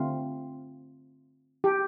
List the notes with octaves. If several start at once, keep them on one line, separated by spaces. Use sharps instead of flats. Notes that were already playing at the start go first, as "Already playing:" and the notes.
Already playing: D3 A3 C4 F4
G4